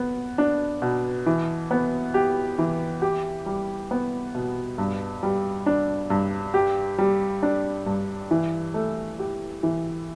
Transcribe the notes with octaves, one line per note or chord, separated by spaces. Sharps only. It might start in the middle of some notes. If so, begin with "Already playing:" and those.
Already playing: B3
D4
B2
E3
B3
G4
E3
G4
G3
B3
B2
G2
G3
D4
G2
G4
G3
D4
G2
E3
A3
G4
E3